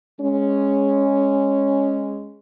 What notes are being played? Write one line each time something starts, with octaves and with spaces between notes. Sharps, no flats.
G#3 C#4